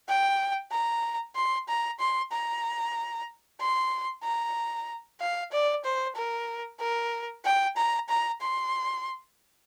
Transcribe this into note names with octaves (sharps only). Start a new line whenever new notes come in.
G5
A#5
C6
A#5
C6
A#5
C6
A#5
F5
D5
C5
A#4
A#4
G5
A#5
A#5
C6